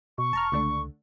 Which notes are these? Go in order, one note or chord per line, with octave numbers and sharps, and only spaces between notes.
B2 C#6
E1 A5 A#5 F6
C#2 D3 A3 D4